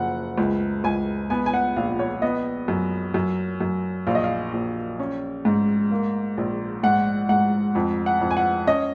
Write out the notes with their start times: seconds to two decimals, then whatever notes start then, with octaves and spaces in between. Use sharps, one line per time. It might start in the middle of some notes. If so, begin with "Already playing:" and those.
Already playing: F#1 F3 F#5
0.38 C#2
0.84 C#2 G#5
1.30 B3 G#5
1.46 G#5
1.54 F#5
1.76 A#1 F5
1.99 C#5
2.22 B3 D#5
2.68 F#2
3.14 F#2
3.61 F#2
4.07 A#1 F5
4.15 D#5
4.24 F5
4.53 A#1
4.99 C#4
5.45 G#2
5.91 A#3
6.37 A#1
6.83 G#2 F#5
7.29 G#2 F#5
7.75 F2
8.06 F#5
8.21 F2
8.31 G#5
8.37 F#5
8.67 C#4 D#5